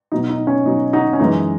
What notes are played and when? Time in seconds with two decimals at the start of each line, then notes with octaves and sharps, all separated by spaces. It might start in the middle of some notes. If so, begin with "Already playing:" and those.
0.12 B2 F#3 D#4
0.30 D#4
0.47 C#4
0.66 B2 F#3 D#4
0.93 D#4 F#4
1.13 C#4
1.20 F#2 E3 G#3 D#4